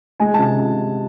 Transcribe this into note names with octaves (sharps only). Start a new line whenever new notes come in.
G#3 G#5
C3 A5